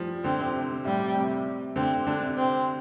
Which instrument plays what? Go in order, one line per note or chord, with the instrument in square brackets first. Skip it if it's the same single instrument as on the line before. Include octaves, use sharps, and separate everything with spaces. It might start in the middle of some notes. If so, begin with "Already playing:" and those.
Already playing: [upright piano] F3 G3
[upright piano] D3 [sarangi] C4
[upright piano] C3
C3
[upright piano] A2 [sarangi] G3
[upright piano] C3
C3
[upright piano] D3 [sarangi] C4
[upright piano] D3 [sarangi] D4
[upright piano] C3
[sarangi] C4